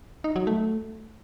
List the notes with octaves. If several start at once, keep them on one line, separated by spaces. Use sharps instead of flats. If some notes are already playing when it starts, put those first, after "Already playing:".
D#4
F#3
A3